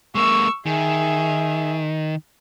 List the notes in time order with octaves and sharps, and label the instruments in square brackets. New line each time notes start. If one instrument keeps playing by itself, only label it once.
[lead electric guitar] G#3 A#3 [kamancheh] C#6 E6
[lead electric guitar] D#3 [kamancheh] G#4 E5